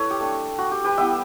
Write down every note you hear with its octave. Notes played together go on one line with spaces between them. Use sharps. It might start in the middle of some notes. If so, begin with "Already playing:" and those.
Already playing: E4 A4 B4 C#5
G4
A3 D4
F#4
G4
G4 B4
G3 B3 E4 E5 G5